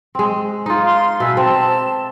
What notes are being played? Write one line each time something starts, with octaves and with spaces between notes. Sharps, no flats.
G#3 C4
D#4 F4
F5 C6
B2 E5 G#5 E6
C4 A5